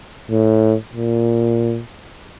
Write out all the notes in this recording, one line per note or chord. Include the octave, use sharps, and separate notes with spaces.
A2
A#2